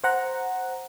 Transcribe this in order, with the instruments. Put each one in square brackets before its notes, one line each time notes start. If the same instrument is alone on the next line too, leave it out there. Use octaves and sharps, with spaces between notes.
[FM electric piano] C5 F#5 A#5